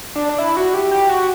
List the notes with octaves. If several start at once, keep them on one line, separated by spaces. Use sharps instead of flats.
D4
D4
E4
F#4
G4
G4
F#4